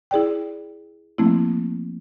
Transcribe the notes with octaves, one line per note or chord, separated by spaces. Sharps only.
E4 G#4 D5 G5
F3 A3 A#3 C4 E4